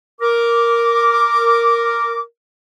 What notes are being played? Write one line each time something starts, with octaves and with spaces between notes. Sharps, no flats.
A#4 D6